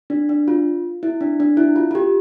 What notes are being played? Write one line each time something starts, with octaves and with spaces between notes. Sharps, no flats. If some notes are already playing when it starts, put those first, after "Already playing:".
D4
D4
F4
E4
D4
D4
E4
F4
F4
G4